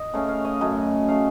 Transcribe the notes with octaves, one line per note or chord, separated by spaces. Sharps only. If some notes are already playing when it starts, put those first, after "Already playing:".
Already playing: D#5
C#3 A3 C#4 F5
F5
D#5
F#2 C#3 A3 D#5
C#3 A3 F5